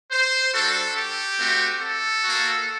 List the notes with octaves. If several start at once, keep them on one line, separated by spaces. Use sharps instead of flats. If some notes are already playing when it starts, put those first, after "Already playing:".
C5
G3 D4 F#4 A4
G4
A3 C4 F#4
A4
A#3 F#4